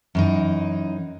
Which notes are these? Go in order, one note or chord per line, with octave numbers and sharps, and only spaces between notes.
F#2 E3 D#4